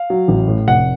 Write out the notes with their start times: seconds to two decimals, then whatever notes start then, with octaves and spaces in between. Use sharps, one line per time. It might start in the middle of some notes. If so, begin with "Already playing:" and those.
Already playing: F5
0.10 F#3
0.28 A1
0.48 A2
0.67 F1 F#5